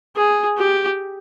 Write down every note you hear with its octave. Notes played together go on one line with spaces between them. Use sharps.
G#4
G4